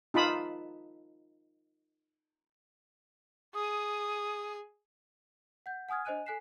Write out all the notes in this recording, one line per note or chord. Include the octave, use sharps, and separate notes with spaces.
D#4 F4 A5 B5 D#6
G#4 D#6
F#5 G6
F#5 G#5 D#6 F6 G#6
D4 C5 D#5 G#5 F#6 D#7
A4 G#5 F#6 B6 C7 E7